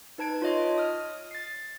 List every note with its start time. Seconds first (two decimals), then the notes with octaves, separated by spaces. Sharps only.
0.18 D#4 B4 A5 G#6 D7
0.42 F4 C#5 D#5 C6
0.78 D#6 F6
1.31 A6 C7